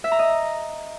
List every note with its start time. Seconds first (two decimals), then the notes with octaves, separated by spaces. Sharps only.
0.04 E5
0.12 A#5
0.19 D#5